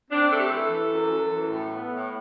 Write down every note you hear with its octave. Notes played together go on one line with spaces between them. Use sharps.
C4 D4
A3 A4
G4
A4
E3
E3
F#2
F#2
E3
A2
B3
A2